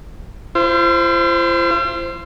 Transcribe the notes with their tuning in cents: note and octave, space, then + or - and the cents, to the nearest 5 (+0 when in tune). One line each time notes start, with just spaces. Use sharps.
F4 -45 C5 +0